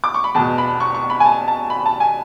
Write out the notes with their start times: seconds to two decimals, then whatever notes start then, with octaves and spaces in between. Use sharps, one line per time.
0.04 D6
0.14 C#6
0.24 B5
0.35 E2 B2 A5
0.58 B5
0.80 C#6
0.95 C#6
1.10 B5
1.20 G#5
1.26 A5
1.48 A5
1.70 B5
1.86 A5
2.00 G#5